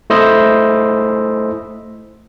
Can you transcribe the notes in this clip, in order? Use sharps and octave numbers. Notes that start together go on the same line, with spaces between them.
A3 E4 C5 D#5 E6